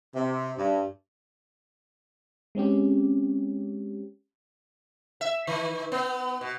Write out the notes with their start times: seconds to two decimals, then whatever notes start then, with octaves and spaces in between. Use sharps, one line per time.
0.15 C3
0.58 G2
2.55 G#3 C4 C#4 G4
5.21 E5
5.47 D#3
5.92 B3
6.41 B2